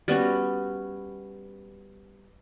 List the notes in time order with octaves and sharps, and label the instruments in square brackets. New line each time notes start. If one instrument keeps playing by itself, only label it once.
[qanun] G3 B3 C#4 F#4